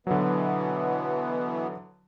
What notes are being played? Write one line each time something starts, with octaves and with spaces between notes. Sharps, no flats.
B2 D3 E3 F#3 B3